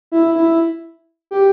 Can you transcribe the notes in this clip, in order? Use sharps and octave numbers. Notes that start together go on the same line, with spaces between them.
E4
E4
G4